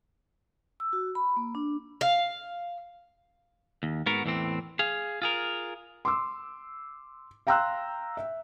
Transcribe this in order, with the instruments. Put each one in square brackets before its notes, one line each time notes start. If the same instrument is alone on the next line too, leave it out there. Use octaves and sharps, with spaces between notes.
[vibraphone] E6
F#4
B5
A#3
D4
[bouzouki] F5
[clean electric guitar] D#2
G#2 B3 F#4 A#4
E2 A2 E3 C4
G#4 F5
F4 G#4 A#4
[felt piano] C6 D6 E6
F5 G5 A#5 C6 E6 F#6
E5